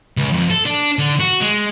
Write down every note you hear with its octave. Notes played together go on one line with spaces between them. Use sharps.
C#2
F2
A4
D4
D3
F#4
G#3